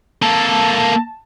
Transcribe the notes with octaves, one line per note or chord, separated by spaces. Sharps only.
A#3 A4 A5